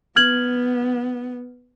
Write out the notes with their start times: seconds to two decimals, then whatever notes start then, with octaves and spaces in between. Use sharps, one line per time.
0.16 B3 F6 G#6 F#7